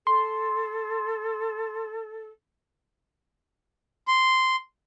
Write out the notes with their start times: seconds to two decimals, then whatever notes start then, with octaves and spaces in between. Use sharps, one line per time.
0.07 A4 C6
4.08 C6